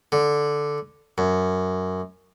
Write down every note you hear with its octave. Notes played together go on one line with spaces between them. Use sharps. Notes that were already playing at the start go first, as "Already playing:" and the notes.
D3
F#2